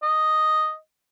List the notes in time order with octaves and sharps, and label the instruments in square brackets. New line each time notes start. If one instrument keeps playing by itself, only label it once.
[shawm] D#5